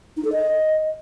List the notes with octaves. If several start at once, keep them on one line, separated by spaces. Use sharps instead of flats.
D#4
A4
D#5